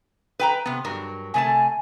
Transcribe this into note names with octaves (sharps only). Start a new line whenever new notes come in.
B4 G5 A#5
C3 B3
G2 F#3 A#4
C3 A3 G#5 A5